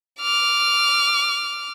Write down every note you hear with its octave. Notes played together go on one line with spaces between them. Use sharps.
D6 F6